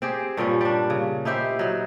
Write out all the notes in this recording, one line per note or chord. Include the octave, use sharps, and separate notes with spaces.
C4 G4 G#4
G2 A#2 G3 C#4
G3 D4
C#3
D#4 E4 G4 C5
F#3 D#4